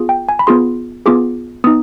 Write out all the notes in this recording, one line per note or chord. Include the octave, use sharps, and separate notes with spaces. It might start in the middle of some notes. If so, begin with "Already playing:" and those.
Already playing: B3 F4 G#4
G5
G#5
B5
B3 F4 G#4 C6
B3 F4 G#4 D6
B3 D#4 D#6